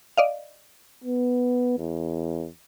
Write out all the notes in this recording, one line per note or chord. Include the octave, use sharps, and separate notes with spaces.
D5 D#5 F5
B3
E2